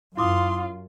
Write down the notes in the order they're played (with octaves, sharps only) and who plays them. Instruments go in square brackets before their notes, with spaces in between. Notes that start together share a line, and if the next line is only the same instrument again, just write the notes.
[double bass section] F#2 [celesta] E4 D6 D#6 [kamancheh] F4 [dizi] C6